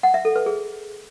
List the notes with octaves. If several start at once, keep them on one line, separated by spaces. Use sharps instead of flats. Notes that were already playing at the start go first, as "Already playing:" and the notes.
F#5
E5
A4
B4
G#4